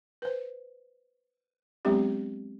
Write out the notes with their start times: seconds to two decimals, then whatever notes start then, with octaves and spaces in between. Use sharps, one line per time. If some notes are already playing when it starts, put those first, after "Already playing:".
0.22 B4 C5
1.85 F#3 G#3 B3 C4 D4 G4